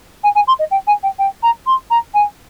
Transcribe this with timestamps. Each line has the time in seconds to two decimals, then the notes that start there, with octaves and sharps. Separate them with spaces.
0.23 G#5
0.35 G#5
0.47 C6
0.59 D#5
0.71 G5
0.87 G#5
1.03 G5
1.19 G5
1.43 A#5
1.66 C6
1.90 A#5
2.14 G#5